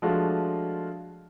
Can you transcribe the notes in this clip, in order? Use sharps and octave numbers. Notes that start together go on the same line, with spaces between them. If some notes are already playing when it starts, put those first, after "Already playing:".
F3 G#3 A3 D4 F4 F#4